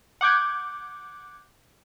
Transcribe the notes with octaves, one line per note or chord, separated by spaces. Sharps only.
F#5 D6 G6 G#6